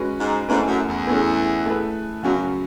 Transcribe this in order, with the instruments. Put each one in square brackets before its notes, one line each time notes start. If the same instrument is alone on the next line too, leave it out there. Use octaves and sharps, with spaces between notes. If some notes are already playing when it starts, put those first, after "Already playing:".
Already playing: [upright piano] G#3 C#4 F#4 B4
[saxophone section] G#2
[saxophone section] G#2 [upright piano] A3 C#4 E4 B4
[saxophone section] F#2
E2
[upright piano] A3 C#4 G#4 B4
A3 E4 G#4 B4
[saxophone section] F#2 [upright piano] C#3 F#3 C#4 F#4